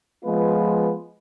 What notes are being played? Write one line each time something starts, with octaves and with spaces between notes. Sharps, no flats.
F3 G#3 B3 F4 B4